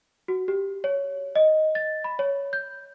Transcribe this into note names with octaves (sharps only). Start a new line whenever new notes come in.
F#4
G4
C#5
D#5
A6
B5
C#5
G6